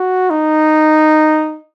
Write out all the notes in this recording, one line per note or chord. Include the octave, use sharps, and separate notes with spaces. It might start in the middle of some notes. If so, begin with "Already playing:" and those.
Already playing: F#4
D#4